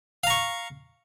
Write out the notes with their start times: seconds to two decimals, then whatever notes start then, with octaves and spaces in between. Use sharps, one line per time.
0.24 F5
0.27 A#5
0.30 C#6